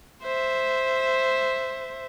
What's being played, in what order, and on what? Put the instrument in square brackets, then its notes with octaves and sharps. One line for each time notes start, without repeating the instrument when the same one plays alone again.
[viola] C5 E5